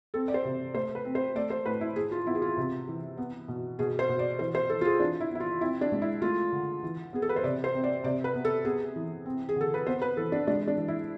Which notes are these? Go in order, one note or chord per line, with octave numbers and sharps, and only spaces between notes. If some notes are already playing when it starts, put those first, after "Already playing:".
C4 A4
D5
C5
C3
A3 C5
B4
C4
C5
A3 D5
C5
A2 B4
E4
A2 G#4
F4
B3 E4
G#4
F4
C3
E3
B3
B2
B2 G#4
C5
B2
D5
E3 C5
C5
E3 A4
F4
G#4
E3 D4
E4
B3 E4
F4
C4 E4
D4
G#3
E4
A3 F4
D3
E3
B3 G#4
A4
B4
C5
C3 D5
C5
C4
D5
C3 D5
B4
B3
A4
B3 G#4
E3
C4
G#4
D3 A4
B4
B3 C5
B4
E3 A4
D4
G#3 D4
D4
E3
E4